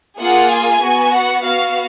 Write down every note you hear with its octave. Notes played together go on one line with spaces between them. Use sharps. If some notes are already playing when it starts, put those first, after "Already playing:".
A#3 F4 G#4 F#5
G#5
B3 F#4
F#5
B3 F#4 F5